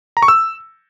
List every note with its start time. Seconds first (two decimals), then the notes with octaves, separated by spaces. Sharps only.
0.17 A#5
0.22 C#6
0.28 E6